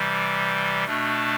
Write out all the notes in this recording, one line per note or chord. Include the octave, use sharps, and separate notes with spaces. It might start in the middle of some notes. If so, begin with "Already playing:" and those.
Already playing: C3 E3 G3
B2 A3 D4